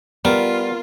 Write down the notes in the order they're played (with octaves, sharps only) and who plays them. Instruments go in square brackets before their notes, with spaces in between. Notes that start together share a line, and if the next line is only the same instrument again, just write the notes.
[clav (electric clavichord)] G3 [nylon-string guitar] B3 [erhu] F4 [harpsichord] A#4